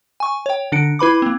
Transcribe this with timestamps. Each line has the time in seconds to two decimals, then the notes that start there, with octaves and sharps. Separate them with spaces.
0.20 G#5 C#6
0.46 C#5 G5
0.72 D3 D4 C#7 D7
0.99 E4 B4 B5 D6
1.22 A#3 C4